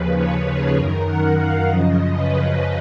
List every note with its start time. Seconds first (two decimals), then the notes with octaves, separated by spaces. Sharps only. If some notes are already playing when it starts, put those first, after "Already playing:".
Already playing: D#2 C#3 F3 B4
0.15 C#5
0.46 G#4
0.76 F#2 D#3 A#4
1.06 F#5
1.38 F5
1.69 F#2 C#3 F3 D#5
2.15 B4